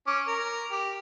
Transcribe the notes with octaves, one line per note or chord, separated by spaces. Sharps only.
C#4 D6
A#4
G4